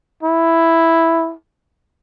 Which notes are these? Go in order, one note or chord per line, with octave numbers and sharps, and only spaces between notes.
E4